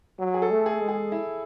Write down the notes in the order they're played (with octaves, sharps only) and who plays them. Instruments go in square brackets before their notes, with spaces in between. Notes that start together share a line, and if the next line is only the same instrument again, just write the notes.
[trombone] F#3
[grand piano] G#4
A4
[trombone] A3
[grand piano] G#4
[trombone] G#3
[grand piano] G#4
E4